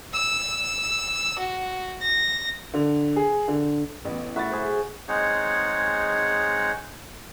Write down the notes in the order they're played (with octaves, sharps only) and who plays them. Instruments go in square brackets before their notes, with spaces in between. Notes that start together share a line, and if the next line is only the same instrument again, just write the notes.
[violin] E6
F#4
A#6
[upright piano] D3
G#4
D3
[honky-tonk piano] A1 B3
[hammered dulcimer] A2 F#4 B5 [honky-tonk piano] E5 A6
[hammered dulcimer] G#4 C5
[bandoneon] G#3 C4 D#4 G#4 C#5 F#5